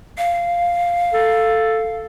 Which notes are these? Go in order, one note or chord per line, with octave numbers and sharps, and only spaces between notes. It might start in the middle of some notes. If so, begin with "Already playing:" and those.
F5
A4